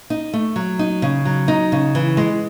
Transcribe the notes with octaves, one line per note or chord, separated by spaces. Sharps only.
D#4
A3
F#3
D#4
C#3
F#3
D#4
C#3
E3
G#3